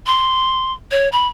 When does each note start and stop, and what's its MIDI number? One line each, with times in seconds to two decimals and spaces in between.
0.06 0.72 84
0.91 1.08 73
1.12 1.27 83